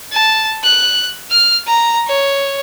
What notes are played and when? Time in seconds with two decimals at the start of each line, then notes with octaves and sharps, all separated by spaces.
0.13 A5
0.64 F#6
1.31 F6
1.67 A#5
2.07 C#5